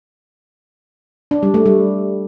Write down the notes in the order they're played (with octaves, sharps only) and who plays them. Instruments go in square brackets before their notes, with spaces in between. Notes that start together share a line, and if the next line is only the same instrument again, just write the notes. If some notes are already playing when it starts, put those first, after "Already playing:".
[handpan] D4
G3
A3
G3